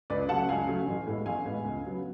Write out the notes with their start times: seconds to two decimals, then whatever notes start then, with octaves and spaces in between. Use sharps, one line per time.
0.10 C#2 B4 D5
0.29 C#3 F#3 A3 F#5 A5
0.49 C#2 F5 G#5
0.67 C#3 F#3 A3
0.87 A1
1.07 A2 G#3 B3
1.26 A1 F5 G#5
1.45 A2 G#3 B3
1.64 C#2
1.84 C#3 F#3 B3